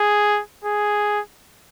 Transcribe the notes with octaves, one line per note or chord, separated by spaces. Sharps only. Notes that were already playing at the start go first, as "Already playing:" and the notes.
Already playing: G#4
G#4